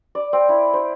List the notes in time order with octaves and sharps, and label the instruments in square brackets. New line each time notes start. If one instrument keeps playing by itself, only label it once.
[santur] D5
C4
E4
C5